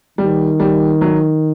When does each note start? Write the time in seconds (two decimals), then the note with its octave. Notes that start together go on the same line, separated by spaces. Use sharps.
0.18 D#3 G3
0.60 G3
1.01 F#3